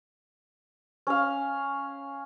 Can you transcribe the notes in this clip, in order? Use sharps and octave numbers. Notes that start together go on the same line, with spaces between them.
C#4 F5